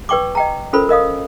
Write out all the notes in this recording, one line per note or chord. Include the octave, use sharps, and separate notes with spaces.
B4 D5 G5 C#6 D6
D#5 G5 A#5
C#4 F4 A4 A#4 C5 B5
A#4 D#5 F5 D#6